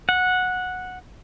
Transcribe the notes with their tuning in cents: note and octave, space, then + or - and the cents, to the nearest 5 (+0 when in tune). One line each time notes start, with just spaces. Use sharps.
F#5 -10